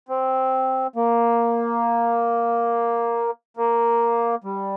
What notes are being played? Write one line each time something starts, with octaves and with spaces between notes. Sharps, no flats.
C4
A#3
A#3
G3